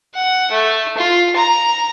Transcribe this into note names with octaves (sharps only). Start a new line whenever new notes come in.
F#5
A3
F4
A#5